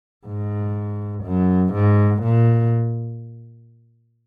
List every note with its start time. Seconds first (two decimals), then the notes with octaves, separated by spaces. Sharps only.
0.26 G#2
1.24 F#2
1.73 G#2
2.22 A#2